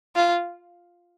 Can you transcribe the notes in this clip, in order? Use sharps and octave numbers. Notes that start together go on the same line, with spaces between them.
F4